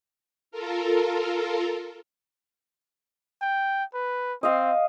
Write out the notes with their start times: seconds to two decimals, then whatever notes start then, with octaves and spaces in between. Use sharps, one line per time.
0.51 F4 A4 A#4
3.41 G5
3.94 B4
4.43 C4 D#5 F5